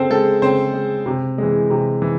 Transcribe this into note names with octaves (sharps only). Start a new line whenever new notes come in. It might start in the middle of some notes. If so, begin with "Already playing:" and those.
Already playing: C#3 C4 A4 C5
G#3 A4
C#3 C4 C5
G#3
C3
E3 G#3
C3
E3